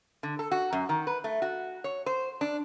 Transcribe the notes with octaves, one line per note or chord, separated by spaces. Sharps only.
D3
A4
F#4
F#2
D#3
B4
A3
F#4
C#5
C5
D4